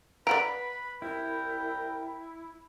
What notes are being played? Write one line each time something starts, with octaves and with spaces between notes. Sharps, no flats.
B4 D5 F#5 A#5 B5 D7
C2 E4 A#4 G5